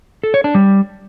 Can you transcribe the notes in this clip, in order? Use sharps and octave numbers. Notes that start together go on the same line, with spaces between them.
A4
C#5
D4
G3